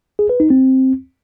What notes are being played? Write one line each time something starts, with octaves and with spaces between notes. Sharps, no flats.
G#4
B4
D#4
C4